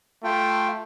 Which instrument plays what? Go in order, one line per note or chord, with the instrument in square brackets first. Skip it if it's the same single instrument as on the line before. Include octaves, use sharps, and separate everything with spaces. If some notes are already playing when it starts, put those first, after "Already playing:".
[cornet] A3 [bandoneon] F4 G5